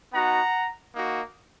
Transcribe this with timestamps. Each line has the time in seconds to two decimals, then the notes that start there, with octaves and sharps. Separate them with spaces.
0.13 B3 D#4 F#4 F#5 A#5
0.93 A#3 D#4 F#4